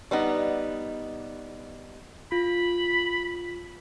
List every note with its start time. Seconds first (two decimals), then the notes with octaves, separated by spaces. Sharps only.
0.11 G3 B3 D#4
2.32 F4 B5